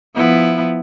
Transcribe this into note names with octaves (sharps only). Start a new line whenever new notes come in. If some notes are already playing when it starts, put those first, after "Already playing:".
F3 B3 E4